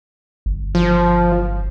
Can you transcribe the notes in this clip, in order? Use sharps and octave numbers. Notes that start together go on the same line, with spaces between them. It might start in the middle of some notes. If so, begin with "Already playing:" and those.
G1
F3